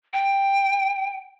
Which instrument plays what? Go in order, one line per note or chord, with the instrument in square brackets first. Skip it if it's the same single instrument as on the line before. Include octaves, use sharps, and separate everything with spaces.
[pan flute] G5